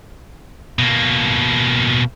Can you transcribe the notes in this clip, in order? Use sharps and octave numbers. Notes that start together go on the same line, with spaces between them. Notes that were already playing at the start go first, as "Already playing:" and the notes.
B2 A#3